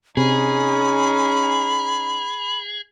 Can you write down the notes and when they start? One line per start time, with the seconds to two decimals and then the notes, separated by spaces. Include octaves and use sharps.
0.17 C3 C#4 D#4 G#4 B5